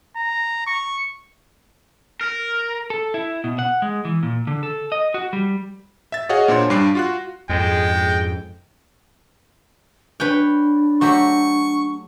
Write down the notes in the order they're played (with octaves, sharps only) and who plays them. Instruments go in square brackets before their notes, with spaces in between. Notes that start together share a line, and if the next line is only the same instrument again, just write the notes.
[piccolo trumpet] A#5
C#6
[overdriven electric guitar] A#4
[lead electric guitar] A4
E4
B2
F#5
G#3
E3
A#2
D3
A4
D#5
F#4
G3
[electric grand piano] E5 A6
F#4 G#4 C#5 D#5 F5 F#5
A#2 D4 C5 C#5 C6
G2 G3 D4 D6 C7
F4 F#4 F#6
[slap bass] F2 G#2 [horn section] G#3 [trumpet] G5
[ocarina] D4 [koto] B4 C#5 G5
[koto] F#3 A3 G4 [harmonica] C#6